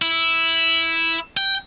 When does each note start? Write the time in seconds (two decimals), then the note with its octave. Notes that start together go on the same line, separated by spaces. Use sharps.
0.02 E4
1.37 G5